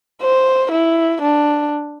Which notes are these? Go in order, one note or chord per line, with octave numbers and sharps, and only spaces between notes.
C5
E4
D4